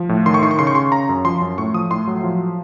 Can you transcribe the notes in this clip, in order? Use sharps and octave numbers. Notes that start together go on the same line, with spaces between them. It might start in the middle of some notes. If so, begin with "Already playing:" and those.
Already playing: F3
A2
D#3 C6
C#6
D#3 C6
C#6
C#3 C6
C#6
C#3 C6
C#3 A#5
F#2
F3 C6
F#2
A2 C#6
F3 D#6
A2 C6
F#3
F3